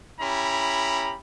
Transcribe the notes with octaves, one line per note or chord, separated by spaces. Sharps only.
C#4 E4 G4 A#5 B5